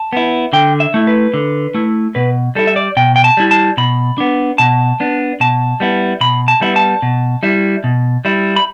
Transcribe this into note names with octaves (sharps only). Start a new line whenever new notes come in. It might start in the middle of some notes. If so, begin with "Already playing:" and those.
Already playing: A5
B3 E4
D3 G5
E5
A3 E4
B4
D3
A3 E4
B2 B4
G3 E4 A4
E5
D5
B2 G5
G5
A5
G3 E4
A5
B2 B5
B3 D4
B2 A5
B3 D4
B2 A5
G3 B3 E4
B2 B5
A5
G3 B3 E4
A5
B2
G3 E4
B2
G3 E4
B5